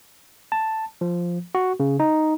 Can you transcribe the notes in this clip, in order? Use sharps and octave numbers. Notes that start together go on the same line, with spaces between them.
A5
F3
F#4
C#3
D#4